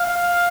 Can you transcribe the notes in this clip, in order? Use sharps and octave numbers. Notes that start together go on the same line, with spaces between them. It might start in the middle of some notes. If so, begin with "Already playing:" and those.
Already playing: F5